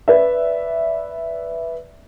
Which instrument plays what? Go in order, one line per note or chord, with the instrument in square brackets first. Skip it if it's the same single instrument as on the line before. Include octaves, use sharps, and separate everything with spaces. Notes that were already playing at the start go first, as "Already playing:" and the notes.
[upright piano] B4 D5 E5